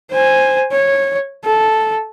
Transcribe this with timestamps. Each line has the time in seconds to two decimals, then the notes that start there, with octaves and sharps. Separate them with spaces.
0.11 C5 G#5
0.72 C#5
1.45 A4